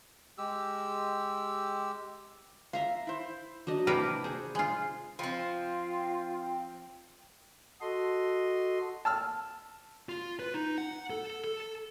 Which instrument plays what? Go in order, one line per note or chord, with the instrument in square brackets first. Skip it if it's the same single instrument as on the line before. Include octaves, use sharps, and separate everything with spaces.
[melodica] G#3 G4 E6
[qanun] E5 A#5 C6 [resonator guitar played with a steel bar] F5
[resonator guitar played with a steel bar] E4 C5
[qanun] F#3 D4 D#5
[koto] C3 A#4 B4 [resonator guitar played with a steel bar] A#3 E4 [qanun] D5 G5 B5
[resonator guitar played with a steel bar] G#4 [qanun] C5 F#5
[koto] G#3 F4
[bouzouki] F3 C4 [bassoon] F4 [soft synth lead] G5
[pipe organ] F#4 A4 D#5 C6
[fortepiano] A5 E6 F6
[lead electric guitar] F4
B4
D#4
F#5
A4
A4